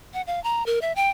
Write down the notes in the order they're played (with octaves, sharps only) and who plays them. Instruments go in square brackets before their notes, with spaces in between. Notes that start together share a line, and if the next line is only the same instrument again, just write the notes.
[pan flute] F#5
F5
A#5
A#4
E5
G5